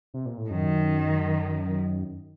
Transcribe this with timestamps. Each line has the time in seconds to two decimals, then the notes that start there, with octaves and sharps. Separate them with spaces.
0.14 C3
0.26 A#2
0.38 A2
0.50 F#2 D#3